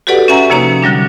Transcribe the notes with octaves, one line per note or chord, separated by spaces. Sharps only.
F#4 G4 A4 B4 D5 F#5
C#4 E5 F#5 G#5 A#5
C3 F3 A#3 D#4 C#5 A#5
D3 F#3 G3 D4